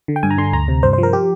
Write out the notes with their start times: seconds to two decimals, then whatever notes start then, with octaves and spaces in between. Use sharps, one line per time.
0.08 D3
0.16 G5
0.23 G2 G#5
0.31 A#5
0.38 D3 C6
0.53 D2 A#5
0.68 C3
0.83 G2 C5
0.93 C5
0.98 F3
1.03 A#4
1.13 G4